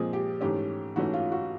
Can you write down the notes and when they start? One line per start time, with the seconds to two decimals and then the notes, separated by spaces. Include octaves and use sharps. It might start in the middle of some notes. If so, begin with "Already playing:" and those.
Already playing: A#2 F3 G#3 C4 G#4
0.13 G4
0.41 G#2 E3 A3 C#4 G4
0.96 G#2 E3 A3 C#4 F#4
1.14 F4
1.32 F#4